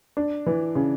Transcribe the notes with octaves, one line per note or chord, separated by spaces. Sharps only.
D4
E3
C#3